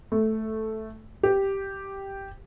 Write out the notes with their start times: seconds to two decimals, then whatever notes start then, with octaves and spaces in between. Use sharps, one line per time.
0.12 A3
1.23 G4